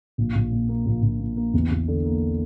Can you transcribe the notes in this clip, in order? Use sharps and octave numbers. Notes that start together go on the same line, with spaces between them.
A#1
A#1
A#2
A#3
A#1
A#1
A#2
A#3
E2
E2
D3
A#3